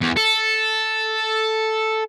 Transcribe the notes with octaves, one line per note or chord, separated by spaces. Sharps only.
E2
A4